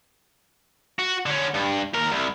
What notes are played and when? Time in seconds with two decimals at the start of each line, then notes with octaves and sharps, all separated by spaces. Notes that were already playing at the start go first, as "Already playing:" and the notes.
0.99 F#4
1.26 D3 C#4
1.54 G2
1.94 D#2 A#4
2.12 C2